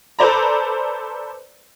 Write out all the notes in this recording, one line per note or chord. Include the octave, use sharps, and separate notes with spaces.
A4 B4 C5 D5 A#5